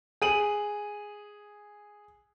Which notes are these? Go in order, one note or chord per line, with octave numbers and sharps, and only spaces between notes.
G#4 D#7 F#7